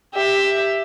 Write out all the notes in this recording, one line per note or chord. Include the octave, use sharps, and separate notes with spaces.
G4 E5